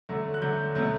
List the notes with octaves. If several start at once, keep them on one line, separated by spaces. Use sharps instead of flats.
D3 F#3 A3
F#6
D3 F#3 A3 G6
B2 F#3 A3